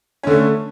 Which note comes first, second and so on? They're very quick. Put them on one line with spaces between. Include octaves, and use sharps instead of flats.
C#4 D3 A3